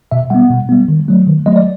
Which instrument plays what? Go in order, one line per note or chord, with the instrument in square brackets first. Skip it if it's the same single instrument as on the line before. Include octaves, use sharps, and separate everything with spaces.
[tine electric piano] B2 E5
G3 B3 F#5
B2
G3 B3
D#3
F#3 A3
D#3
F#3 A3 D#5
D5